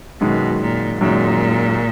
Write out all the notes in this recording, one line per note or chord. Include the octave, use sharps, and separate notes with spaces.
F#2 B2 D#3 G#3
A#2
F#2 A#2 D#3 G#3